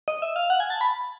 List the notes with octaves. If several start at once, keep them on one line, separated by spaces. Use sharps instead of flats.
D#5
E5
F5
F#5
G#5
A5
B5